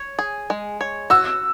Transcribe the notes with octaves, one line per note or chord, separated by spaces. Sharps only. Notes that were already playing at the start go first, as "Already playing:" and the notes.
Already playing: C#5
G#4
G#3
C#5
F#4 E6